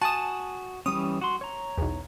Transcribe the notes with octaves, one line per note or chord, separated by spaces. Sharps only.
F#4 G#5 A5 D#6 E7
E3 G3 C#4 D#6
F#4 C6
C#5 A#5
B1 E2